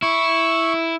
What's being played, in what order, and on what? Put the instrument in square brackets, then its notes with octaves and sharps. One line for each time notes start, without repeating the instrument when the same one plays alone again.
[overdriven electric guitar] E4 [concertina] C#6